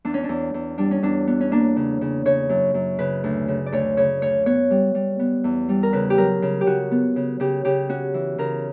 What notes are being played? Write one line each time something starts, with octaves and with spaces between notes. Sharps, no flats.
E2 D4
C#4
D4
E2
E2
G3 D4
C#4
E2 D4
B3
C#4
A#3 D4
C#3
C#3
C#3 C#5
F#2
F#2
C#3 B4
D2
C#3
D5
D2 C#5
C#3 C#5
D2 C#5
B3 C#5
G3
G3
B3
E2
G3
A#4
C#3 B4
G4
F#3 A#4
C#3
G4
C#3 F#4
B3
C#3
C#3 G4
C#3 G4
C#4 F#4
E3
C#3 A#4